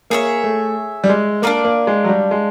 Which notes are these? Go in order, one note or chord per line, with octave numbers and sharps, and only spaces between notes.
A#3 G#4 C#5 E5
A3
G3
G#3
A#3 D4 F4 A#4 D5
A#3
G#3
F#3
G3
G#3